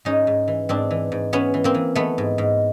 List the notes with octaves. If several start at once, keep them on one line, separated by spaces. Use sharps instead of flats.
G#2 C#4 D#4
G#2
E3
G#2 C4 D4
E3
G#2
E3 B3 C#4
E3
A#3 C4
E3
E3 A3 B3
G#2
G#2